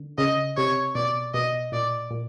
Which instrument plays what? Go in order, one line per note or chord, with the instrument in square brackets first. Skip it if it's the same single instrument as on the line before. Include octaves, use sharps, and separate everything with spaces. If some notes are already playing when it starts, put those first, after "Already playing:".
Already playing: [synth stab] D3
[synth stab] C#3 [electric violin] D#5
[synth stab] C3 [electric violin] C#5
[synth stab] B2 [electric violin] D5
[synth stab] B2 [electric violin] D#5
[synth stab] A#2 [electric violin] D5
[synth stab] A#2